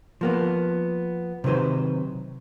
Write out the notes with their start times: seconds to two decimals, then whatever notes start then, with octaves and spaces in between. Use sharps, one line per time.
0.21 F3 A#3 B3
1.44 C3 D#3 F#3 B4 C5